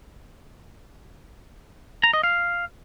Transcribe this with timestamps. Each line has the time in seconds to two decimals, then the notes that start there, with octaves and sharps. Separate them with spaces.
2.04 A#5
2.13 D#5
2.23 F5